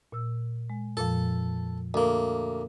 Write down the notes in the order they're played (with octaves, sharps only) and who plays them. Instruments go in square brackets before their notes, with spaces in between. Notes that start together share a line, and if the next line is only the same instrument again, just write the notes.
[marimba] A#2 E6
G#3
[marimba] F2 A#2 F3 [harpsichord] A4
[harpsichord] D2 A#3